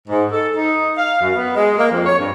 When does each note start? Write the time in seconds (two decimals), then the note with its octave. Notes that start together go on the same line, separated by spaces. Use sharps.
0.08 G#2
0.32 A4
0.56 D#4
0.98 F5
1.21 F#2
1.36 B3
1.55 G#3
1.78 A#3
1.92 F2
2.06 C#5
2.19 G2